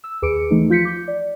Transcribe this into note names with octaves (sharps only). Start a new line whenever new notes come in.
E6
D#2 G#4 B4 D6 C#7 D7
E3 A3 D#4
F3 F4 G6 B6 C#7
D6 G6
D5